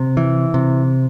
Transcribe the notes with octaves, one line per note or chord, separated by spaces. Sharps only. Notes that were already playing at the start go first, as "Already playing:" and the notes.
Already playing: C3
E3
C3